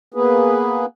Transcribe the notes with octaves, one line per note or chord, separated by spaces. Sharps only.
A#3 B3 G#4 B4